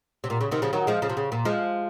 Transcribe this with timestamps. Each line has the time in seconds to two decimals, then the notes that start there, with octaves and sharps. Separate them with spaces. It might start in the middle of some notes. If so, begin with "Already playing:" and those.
0.24 C3
0.30 A#2
0.41 C#3
0.51 C3 D#3
0.62 C#3 F3
0.73 D#3 F#3
0.87 F3 G#3
1.02 C#3 F3
1.09 C3
1.17 C#3
1.32 A#2
1.45 F3 G#3